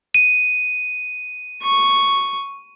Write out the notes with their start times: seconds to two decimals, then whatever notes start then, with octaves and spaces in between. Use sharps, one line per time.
0.14 D#7
1.63 C#6